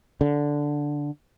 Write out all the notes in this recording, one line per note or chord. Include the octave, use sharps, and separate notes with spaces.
D3